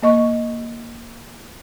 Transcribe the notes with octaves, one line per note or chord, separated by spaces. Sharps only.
A#3 D#5 C#6